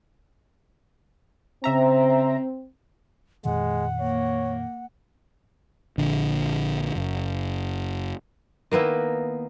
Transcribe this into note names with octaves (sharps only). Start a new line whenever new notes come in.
C#3 C4 E5 A#5
F2 A#2 D#3 G#3 F#5
A#3 C#5
A#1 D3
F#1
D#3 A#3 B3 E4